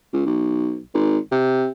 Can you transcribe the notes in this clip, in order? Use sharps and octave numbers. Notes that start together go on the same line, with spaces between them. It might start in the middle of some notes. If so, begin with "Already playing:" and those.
C#2
B1
G#1
C3